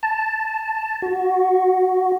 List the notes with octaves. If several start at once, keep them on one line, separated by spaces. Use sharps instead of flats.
A5
F#4